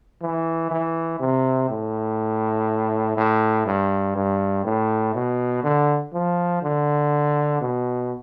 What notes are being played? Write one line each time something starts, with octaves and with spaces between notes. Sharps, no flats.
E3
E3
C3
A2
A2
G2
G2
A2
B2
D3
F3
D3
B2